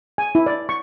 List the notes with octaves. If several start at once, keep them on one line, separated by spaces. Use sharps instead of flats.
G#5
E4
D5
C#6